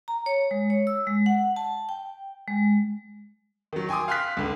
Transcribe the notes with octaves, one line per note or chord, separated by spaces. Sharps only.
A#5
C#5
G#3
C#5
E6
G#3
F#5
A5
G5
G#3
D#3 F#3
G5 G#5 C6 D6 D#6
F5 G5 C6 F6 F#6 B6
C#2 D3